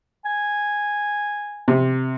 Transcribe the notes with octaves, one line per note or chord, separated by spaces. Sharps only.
G#5
C3